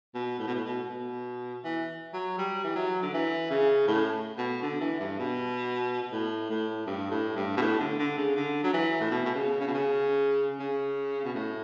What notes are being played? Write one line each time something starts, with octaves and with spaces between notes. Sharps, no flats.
B2
A2
B2
A2
B2
B2
E3
F#3
G3
E3
F#3
D3
E3
C#3
A2
B2
D3
E3
G2
B2
B2
A2
A2
G2
A2
G2
B2
A2
D3
D3
C#3
D3
F#3
E3
A2
B2
B2
C#3
C#3
B2
C#3
C#3
B2
A2